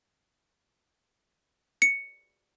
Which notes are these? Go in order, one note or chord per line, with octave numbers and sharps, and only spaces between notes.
C#7